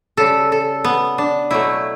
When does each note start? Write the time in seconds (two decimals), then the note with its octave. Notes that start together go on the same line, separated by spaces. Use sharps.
0.17 C#3 G3 A4
0.52 A4
0.84 B3
1.18 D4
1.51 B2 F#3 A3 E4